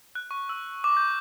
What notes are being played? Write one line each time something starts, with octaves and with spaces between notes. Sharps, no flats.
F#6
C#6
E6
D6
G6